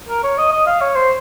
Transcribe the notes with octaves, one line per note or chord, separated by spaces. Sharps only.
A#4
C#5
D#5
D#5
F5
C#5
C5